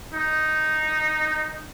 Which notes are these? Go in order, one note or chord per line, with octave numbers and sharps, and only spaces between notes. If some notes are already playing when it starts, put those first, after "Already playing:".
D#4